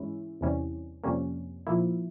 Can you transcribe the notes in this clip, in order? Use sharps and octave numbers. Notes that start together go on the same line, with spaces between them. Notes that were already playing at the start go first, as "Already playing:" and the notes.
Already playing: G#2 E3 G#3 C#4 E4
E2 C3 E3 G3 C#4
F2 C3 G3 A#3 C#4
A#2 F3 A#3 E4